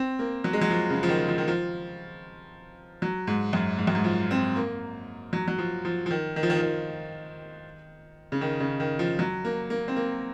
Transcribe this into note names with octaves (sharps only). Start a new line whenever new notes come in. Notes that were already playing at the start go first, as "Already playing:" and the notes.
Already playing: C4
A#3
F#3
G#3
F#3
F3
C#3
F3
D#3
F3
D#3
F3
F#3
G#2
F#2
G#2
F#2
G#2
F3
C4
A#3
F#3
F#3
F3
F3
F3
D#3
D#3
F3
D#3
F3
D#3
C#3
D#3
C#3
D#3
F3
F#3
A#3
A#3
C4
A#3